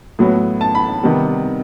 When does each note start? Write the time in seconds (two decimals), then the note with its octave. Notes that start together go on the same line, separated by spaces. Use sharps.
0.19 A2 F#3 B3
0.61 A5
0.75 B5
1.03 C3 D#3 G3 B3